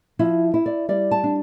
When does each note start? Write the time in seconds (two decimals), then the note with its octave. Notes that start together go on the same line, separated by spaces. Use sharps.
0.19 F3 E4
0.54 E4
0.66 D5
0.89 G3 D5
1.11 A5
1.24 D4